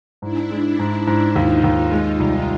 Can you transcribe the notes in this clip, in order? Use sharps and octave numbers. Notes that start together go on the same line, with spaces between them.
G#2 D4 E4
G#3
G#2
G#2
D#2 D#4 F4
D#2
G#3
C2